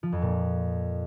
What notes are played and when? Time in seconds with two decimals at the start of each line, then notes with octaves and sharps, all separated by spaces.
0.03 F3
0.12 F2
0.22 A#2